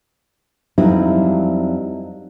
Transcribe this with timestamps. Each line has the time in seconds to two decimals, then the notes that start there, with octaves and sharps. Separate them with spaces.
0.78 F2 F#3 G3 C4 D#4 E4